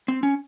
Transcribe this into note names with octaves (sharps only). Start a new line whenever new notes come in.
C4
C#4